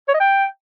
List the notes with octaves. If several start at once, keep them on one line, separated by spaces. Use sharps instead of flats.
C#5
D#5
G5